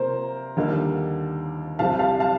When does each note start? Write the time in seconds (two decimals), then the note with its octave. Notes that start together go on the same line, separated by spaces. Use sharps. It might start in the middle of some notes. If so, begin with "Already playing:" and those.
Already playing: C3 A#3 F4 A#4 C5
0.56 D#2 D3 G3 A#3 D#4
1.79 C2 C3 G3 F5 A5
1.99 F5 A5
2.20 F5 A5